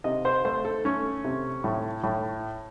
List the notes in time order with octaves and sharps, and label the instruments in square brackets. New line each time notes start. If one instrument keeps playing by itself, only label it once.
[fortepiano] C3 D#5
C5
A3 C5
A4
A3 C#4
C3
A2
A2